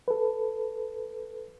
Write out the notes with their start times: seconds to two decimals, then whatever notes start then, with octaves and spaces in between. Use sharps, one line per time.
0.08 A4 B4